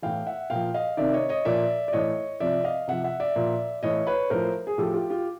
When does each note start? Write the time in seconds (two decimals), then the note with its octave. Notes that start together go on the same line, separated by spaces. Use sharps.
0.02 A2 E3 F5 G5
0.27 E5 F#5
0.50 A#2 F3 F5 G5
0.74 D#5 F5
0.97 C3 D#3 D5 E5
1.14 C#5 D#5
1.29 C#5 D#5
1.45 A#2 F3 D5 E5
1.88 D5
1.93 A2 E3 C#5 D#5
2.40 C3 F3 D5 E5
2.64 D#5 F5
2.88 C3 F3 E5 F#5
3.04 E5 F#5
3.20 D5 E5
3.36 A#2 F3
3.83 A2 E3 C#5 D#5
4.07 B4 C#5
4.30 A2 F3 A#4 C5
4.67 G#4
4.78 A2 F3 G4 A4
4.94 F4 G4
5.10 F4 G4